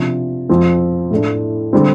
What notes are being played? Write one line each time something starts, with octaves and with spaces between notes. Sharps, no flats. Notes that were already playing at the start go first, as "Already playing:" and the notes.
Already playing: C3 F3 D4
F2 F3 C4
A2 A3 D4
D3 G3 C4